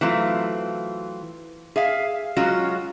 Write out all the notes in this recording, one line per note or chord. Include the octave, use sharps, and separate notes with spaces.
E3 F#3 A3 C4 F4
G#4 E5 F5
F#3 G#3 C#4 F4 F#4